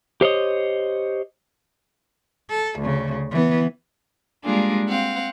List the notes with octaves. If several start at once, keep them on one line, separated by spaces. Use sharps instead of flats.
G4 C5 C#5 D#5
A4
D2 C#3
E3 B3
G3 G#3 A#3 D4 F4 G#4
C4 F5 F#5